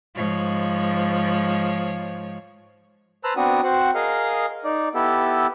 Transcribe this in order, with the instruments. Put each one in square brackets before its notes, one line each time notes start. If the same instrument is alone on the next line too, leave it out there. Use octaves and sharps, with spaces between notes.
[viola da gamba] G#2 F3 C#5
[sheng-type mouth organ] B4 C5 A5 A#5 E6 F#6
B3 C4 D4 F#4 D#6
C4 F#4 C5 F#5
G#4 A#4 D#5 F5
D#4 D5
B3 E4 G4 A4